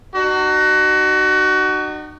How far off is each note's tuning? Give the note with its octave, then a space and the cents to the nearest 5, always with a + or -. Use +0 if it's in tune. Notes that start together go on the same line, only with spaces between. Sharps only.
D#4 -40 F#4 +25